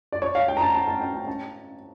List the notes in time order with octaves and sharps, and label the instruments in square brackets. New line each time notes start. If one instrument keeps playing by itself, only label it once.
[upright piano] D5
C#5
F5
G5
A#5
A5
A5
A5
G5
G5
A5